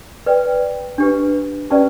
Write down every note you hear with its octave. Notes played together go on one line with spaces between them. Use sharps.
B4 D5 G5
D4 G4 B4
C#4 G4 B4 D5 A5